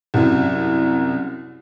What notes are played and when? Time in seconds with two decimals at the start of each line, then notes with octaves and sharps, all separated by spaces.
0.14 C2 F#2